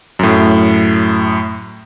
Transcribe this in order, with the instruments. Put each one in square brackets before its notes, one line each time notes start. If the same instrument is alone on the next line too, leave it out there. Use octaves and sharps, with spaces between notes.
[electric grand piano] F#2 A2